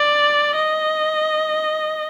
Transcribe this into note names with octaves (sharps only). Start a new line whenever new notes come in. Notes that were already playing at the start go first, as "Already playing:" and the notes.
Already playing: D5
D#5